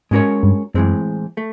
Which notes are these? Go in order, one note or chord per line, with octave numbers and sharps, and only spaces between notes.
G#2 G#3 C#4 F#4 A#4 C#5
G2
F#2 A2 E3 G#3 C4
A3